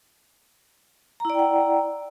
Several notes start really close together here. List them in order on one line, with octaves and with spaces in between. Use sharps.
A#5 E4 D5 G5 F#5